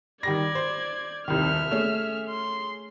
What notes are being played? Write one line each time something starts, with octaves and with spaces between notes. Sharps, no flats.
D#3 G3 D5 G#6 A#6
C5
D#1 C2 D#3 E5 F6
A3 C#4 G#4
C6